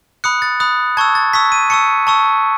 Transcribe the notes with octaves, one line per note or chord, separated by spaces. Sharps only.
B5 D#6 F#6 C#7
A6
B5 D#6 F#6
A5 C#6 E6 G#6
A6
A5 C#6 E6 B6
D#7
A5 C#6 E6 C#7
A5 C#6 E6